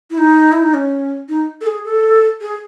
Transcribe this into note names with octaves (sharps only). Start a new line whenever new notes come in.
E4
D#4
E4
D#4
C#4
D#4
A4
G#4
A4
G#4